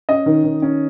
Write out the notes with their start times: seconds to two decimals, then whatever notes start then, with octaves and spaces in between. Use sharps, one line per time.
0.09 C#4 D#5
0.26 D#3
0.44 D#3
0.62 C#4